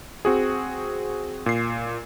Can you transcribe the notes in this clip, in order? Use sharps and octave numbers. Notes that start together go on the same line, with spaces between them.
C4 F#4 G#4
A#2 C7